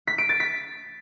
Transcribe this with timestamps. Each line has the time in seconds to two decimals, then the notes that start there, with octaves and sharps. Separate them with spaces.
0.07 B6
0.18 D7
0.29 A6
0.40 B6